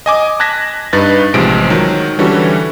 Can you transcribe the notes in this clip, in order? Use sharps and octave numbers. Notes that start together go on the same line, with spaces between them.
D#5 G#5 D6
A5 F#6 G#6 A#6 B6
G2 D#4 B4 A6 A#6
A1 C3 F3 G#3 D7
D#3 F#3
D3 E3 G3 C#4 F#4 A4